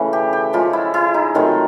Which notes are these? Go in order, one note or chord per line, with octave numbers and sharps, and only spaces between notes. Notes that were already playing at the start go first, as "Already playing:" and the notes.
Already playing: C#3 E3 A3
G4
G4
C#3 F3 G#3 F4
E4
E4
D#4
C3 D#3 F#3 A3 F4